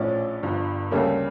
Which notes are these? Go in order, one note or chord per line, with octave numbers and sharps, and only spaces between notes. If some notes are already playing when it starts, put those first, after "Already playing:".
Already playing: A#1 A2 F3 C#4 D5
G1 G2 F3
D2 C#3 G3 A#3 C#4 A4